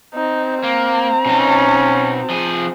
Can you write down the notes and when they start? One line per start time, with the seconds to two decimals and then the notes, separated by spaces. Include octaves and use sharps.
0.15 C4 D#4
0.64 A#3 A#5
1.25 B2 C#4 D#4
2.29 F3 G#4